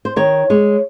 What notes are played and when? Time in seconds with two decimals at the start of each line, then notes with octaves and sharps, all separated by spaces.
0.05 C5
0.16 D#3 C#5
0.50 G#3 C#5